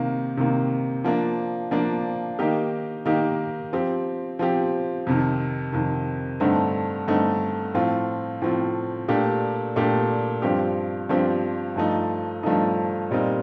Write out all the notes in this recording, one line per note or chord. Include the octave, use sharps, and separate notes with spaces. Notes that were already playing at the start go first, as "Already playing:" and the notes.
Already playing: C3 D#3 A#3
C3 D#3 A#3
F3 A#3 D4
F3 A#3 D4
D#3 A#3 D#4 G4
D#3 A#3 D#4 G4
F3 C4 G4
F3 C4 G4
F2 C3 D#3
F2 C3 D#3
G2 D3 A3 C4 D#4
G2 D3 A3 C4 D#4
A2 F3 C4 F4
A2 F3 C4 F4
A#2 A3 D4 G4
A#2 A3 D4 G4
G2 F3 C4 G4
G2 F3 C4 G4
G2 F3 A3 D#4
G2 F3 A3 D#4
A#2 G3 C4 D#4